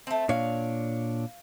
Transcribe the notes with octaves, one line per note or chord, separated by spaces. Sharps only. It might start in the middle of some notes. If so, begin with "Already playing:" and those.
A3 C4
A#2 D4 C#5 F5